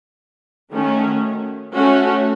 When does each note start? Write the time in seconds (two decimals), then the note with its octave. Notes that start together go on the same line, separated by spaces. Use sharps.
0.71 D#3 A3 C#4 F#4
1.72 A3 C#4 F#4